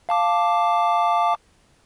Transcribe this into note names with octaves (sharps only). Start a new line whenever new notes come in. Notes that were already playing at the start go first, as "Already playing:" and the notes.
F5 A5 D6